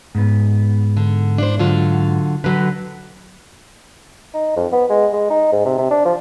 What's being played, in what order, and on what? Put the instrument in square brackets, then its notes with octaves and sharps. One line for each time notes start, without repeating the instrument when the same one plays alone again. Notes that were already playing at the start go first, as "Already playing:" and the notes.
[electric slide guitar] G#2 B3
[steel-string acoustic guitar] D3
D4 E4 C5
D3 F#3 F4
[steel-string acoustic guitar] D3 F#3 [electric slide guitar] B4
[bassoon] D#4
F2
B3
G#3
G#3
D#4
G#2
C3
C3
D4
F3